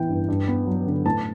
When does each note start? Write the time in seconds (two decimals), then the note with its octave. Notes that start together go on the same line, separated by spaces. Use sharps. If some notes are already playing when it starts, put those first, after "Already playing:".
Already playing: A1 E3 B3 G5
0.09 G2
0.28 G2
0.48 B3
0.66 F#3
0.87 D3
1.05 A2 A5